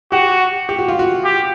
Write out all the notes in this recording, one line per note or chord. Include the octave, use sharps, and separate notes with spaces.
F#4 G4
G4
F#4
F4
F#4
G4